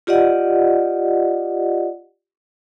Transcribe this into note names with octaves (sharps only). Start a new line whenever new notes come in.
F4 G4 D5 D#5 F#5